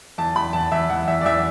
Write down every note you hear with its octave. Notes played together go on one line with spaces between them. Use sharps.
E2 A5
E2 B5
E2 A5
E2 E5
E2 F#5
E2 E5
D5
E2 E5